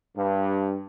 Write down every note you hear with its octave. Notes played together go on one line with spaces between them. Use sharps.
G2